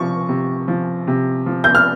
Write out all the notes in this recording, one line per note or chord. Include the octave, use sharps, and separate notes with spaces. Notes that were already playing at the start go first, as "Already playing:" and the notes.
Already playing: C3 F3 C#6
C3
F3
C3
F3
G6
F6